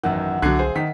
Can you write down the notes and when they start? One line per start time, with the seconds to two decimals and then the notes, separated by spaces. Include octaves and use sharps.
0.03 A1 F#2 D#3 E5 F#5
0.42 C2 D3 F#3 F#6 G#6 C7
0.59 G#4 C5
0.76 D#3 D#4 B6